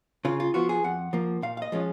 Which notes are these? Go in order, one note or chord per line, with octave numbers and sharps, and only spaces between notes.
C#3 F4
F4
F3 B3 F4 F#4
G#4
F2 F#5
F3 A#3
A#2 F5
F5
D#5
F3 G#3 C#4 F4